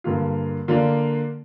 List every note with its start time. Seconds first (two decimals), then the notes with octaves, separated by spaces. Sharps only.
0.04 G2 D3 A#3 F4
0.68 D3 A#3 F4 D5